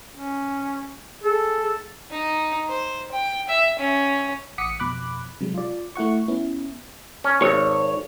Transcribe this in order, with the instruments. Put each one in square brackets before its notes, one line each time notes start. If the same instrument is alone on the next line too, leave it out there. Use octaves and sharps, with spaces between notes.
[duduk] C#4
[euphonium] G#4 [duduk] A4
[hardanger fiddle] D#4
C5
G5
E5
C#4
[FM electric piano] A1 F#5 D6 D#6 B6 C#7
F2 B2 B5 D6 F#6
C3 F#3 G#3
F4 D5
A3 E4 F#5 C#6
B3 C#4 E4
[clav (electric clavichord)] C#4
[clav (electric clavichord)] G#1 [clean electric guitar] C#5